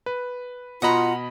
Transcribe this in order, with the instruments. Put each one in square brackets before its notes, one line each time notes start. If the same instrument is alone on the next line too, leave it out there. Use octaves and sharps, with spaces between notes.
[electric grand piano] B4
[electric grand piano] B2 D#5 B5 [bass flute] F4 [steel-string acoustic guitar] F#5 A#5